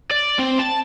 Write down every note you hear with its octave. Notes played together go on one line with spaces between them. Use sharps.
D5
C4
A5